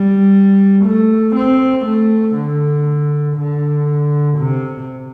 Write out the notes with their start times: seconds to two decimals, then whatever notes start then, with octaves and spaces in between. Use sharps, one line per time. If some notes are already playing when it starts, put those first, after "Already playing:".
Already playing: G3
0.85 A3
1.36 C4
1.86 A3
2.36 D3
3.37 D3
4.38 C3